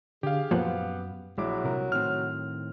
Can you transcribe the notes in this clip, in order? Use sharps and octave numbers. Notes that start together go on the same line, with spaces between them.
D3 G4 G#4 F5
F#2 A#2 F3 B3 F#5
A#1 F#3 G#3 E4 D6
C2 C3 A#4
A2 D#3 C4 F6